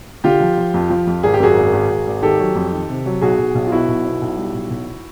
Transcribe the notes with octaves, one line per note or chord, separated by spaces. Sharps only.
D3 F4 G4
F3
F3
F2
F3
F2
G#1 G#4
G4
F#2 F#4 G#4
G#1
G#1
G#1
G#1
D#3 G4 A4
F#3
F2
D#3
C3
F#3
B1 F#4 G#4
B1
B1
F4
B2 E4 F#4
B1
B2
B1
G3
B1
B1